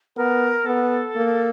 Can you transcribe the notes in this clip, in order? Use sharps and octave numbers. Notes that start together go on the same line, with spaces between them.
B3 A#4
B3 A4
A#3